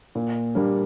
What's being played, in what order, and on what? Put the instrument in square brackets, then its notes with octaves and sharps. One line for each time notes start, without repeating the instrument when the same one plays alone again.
[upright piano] A#2
G3 A#3 D4